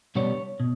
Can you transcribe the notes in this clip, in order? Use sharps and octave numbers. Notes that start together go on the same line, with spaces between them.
B2 G3 B3 D4 C#5
B2